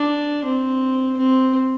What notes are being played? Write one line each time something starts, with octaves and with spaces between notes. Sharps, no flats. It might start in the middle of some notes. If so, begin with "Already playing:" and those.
Already playing: D4
C4
C4